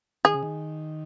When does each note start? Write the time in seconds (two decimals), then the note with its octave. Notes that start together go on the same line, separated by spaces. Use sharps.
0.25 D#3 G#4
0.34 C#3
0.43 D#3